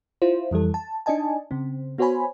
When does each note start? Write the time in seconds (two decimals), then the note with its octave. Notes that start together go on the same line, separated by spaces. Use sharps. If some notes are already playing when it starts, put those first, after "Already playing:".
0.22 E4 F4 C5
0.51 F2 E3 G3 A4
0.74 A5
1.06 D4 D#4 D5 D#5 G#5 A5
1.51 C#3 C4
1.98 B3 F#4 C5 C#5 G#5 B5